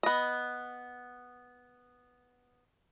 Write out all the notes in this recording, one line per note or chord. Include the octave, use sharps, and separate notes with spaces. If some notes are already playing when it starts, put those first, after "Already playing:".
B3 D#5